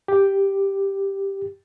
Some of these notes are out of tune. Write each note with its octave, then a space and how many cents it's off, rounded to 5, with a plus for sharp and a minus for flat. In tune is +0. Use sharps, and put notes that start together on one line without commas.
G4 +0